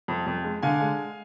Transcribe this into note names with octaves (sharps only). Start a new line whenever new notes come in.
F2
F2
G#3
D3 F5 G#5
G#3